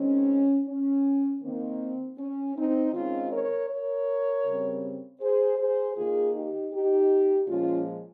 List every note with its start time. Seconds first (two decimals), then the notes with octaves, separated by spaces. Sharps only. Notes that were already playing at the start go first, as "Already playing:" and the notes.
Already playing: D#3 G#3 C4 C#4
0.67 C#4
1.42 D#3 A#3 C4
2.18 C#4
2.56 C4 D#4
2.93 D#3 G#3 C4 C#4 F4
3.31 A#4 C#5
3.70 A#4 C#5
4.44 C#3 G3 C4
5.20 G#4 C5
5.58 G#4 C5
5.95 D#3 A#3 F4 G#4
6.34 D#4 G4
6.72 D#4 G4
7.47 A#2 F3 G#3 C#4 F4